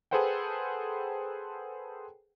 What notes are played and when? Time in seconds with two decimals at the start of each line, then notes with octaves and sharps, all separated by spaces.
0.11 G#4 A4 B4 C5 F#5 G5